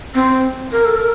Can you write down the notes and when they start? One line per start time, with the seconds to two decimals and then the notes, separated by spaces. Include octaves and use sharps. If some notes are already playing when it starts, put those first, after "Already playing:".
0.14 C4
0.72 A#4
0.85 A4
0.97 A#4